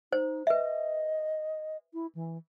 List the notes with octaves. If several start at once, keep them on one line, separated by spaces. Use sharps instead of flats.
D#4 C5
B4 D#5 E5
E4
E3